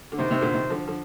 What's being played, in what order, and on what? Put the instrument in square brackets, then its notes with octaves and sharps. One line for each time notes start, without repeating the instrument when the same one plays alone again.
[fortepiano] D3
[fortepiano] C3 D#3 [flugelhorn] C5
[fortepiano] C3 D#3
A#2 D3
C3 D#3
D3 F3
D3 F3